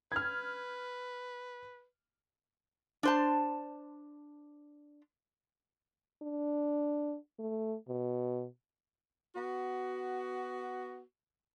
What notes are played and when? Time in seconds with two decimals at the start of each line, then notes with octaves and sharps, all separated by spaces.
0.12 B4 F6 G#6
3.03 D4 C5 A5
6.22 D4
7.39 A3
7.88 B2
9.36 B3 F#4